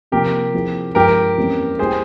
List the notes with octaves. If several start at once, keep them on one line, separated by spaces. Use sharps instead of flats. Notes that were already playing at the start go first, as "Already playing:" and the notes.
C3 F3 A#3 G4 A#4
F3 C4 E4 G#4
G2 F3 G#3 G4 A#4
F2 E3 G3 A#3 C#4
G3 A#3 E4 G4 G#4 C5